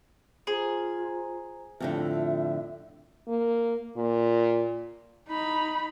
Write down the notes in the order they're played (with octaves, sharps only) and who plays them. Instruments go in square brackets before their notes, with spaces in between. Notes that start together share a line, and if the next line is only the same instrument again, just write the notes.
[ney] F4 [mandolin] G#4 [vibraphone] C5 A#5
[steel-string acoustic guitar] F2 A2 D3 [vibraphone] F4 [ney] E5
[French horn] A#3
A#2
[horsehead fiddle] D#4 B5